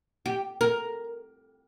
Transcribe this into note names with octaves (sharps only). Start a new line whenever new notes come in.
G4
A#4